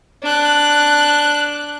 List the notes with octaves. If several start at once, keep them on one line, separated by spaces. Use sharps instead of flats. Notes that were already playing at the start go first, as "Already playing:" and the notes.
D4 F#6